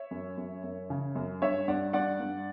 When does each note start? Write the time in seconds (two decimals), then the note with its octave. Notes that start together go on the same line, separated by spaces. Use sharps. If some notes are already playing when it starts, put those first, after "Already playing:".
Already playing: C#5 E5
0.11 F#2
0.38 F#2
0.64 F#2
0.90 C#3
1.16 F#2
1.42 G2 C#5 E5
1.68 G2 D5 F#5
1.93 G2 D5 F#5
2.20 G2